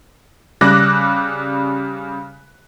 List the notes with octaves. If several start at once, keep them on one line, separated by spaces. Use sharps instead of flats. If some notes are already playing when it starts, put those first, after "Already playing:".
C#3 G3 D6 F#6 A#6